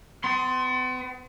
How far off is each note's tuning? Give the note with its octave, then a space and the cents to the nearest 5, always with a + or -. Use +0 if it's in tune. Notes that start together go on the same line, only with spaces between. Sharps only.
B3 +40 C6 +0